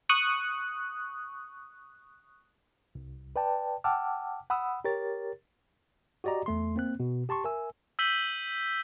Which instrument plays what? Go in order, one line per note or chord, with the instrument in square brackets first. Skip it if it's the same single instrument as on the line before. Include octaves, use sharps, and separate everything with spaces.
[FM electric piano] C#6 D#6 F#6
[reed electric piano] C2
B4 D5 G5 A5
F#5 G5 A5 D6 E6 F6
F#5 B5 D#6 E6
G4 A#4 C#5 A6
[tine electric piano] F#4 G4 D5 D#5 A#5
E2 A3 C6
A#3 C4 F#6
B2
G4 A5 C6 C#6
A#4 E5 G#5 E6
[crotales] E6 G6 B6 D#7 F#7 G7